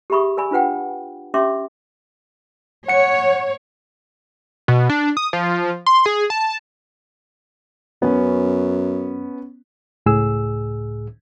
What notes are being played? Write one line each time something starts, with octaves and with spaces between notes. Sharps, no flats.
G4 G#4 E5 B5 C#6 D#6
A#4 D5 G#5 B5
D4 F4 B4 F#5 G5
C#4 G4 E5 C6 D6
C#5 F#5 C#7
B2
D4
D#6
F3
C6
G#4
A5
F#2 B3 C#4
C#2 A2 G#4 E6